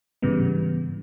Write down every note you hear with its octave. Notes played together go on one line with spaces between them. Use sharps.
G#2 C#3 E3 G3 B3